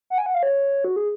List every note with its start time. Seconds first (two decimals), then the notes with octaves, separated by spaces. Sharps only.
0.10 F#5
0.18 G#5
0.26 F#5
0.34 F5
0.43 C#5
0.84 F#4
0.96 G#4